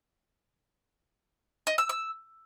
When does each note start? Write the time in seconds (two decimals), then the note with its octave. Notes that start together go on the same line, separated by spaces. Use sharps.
1.67 D#5
1.78 E6
1.89 E6